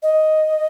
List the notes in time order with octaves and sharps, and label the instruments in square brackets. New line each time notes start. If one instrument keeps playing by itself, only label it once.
[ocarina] D#5